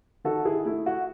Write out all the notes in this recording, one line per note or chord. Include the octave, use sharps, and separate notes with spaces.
D#3 F#4 A4
E4 G#4
A3 E4
F#4